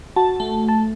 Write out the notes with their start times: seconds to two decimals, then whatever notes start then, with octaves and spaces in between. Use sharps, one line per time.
0.16 F#4 A5
0.40 A3
0.69 A5